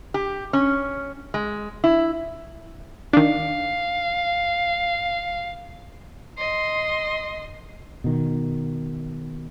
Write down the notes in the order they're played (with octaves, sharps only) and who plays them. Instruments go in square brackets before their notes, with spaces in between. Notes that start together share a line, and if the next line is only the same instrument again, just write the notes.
[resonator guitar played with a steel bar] G4
C#4
G#3
E4
[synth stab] D#3 D4 [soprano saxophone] F5
[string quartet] D#5 C6
[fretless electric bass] B2 D#3